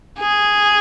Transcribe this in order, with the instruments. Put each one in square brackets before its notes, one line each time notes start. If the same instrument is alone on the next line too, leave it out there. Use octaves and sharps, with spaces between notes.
[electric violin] G#4